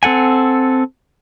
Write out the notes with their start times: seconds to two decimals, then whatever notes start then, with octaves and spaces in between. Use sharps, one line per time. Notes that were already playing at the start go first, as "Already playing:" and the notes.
0.03 C4 A4 F#5 G#5